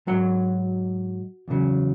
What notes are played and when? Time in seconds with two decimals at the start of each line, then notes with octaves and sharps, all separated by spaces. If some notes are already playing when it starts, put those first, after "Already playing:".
0.07 G#2 F#3 F#4 F#5
1.48 E2 C#3 F#3